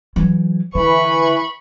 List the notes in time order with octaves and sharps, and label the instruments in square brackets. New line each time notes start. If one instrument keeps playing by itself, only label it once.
[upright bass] E3 F#3
[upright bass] D3 [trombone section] E3 B4 [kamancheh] B5 C#6